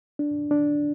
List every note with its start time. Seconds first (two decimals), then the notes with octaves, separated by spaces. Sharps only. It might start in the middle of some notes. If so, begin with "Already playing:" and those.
0.19 D4
0.51 D4